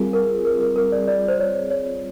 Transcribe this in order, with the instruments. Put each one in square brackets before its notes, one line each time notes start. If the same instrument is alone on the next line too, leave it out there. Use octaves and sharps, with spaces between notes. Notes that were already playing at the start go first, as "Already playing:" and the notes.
Already playing: [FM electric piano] G3 C4 F4 G#4 [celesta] A#4
[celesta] A#4
A#4
A#4
A#4
D5
D5
C5
C#5
C#5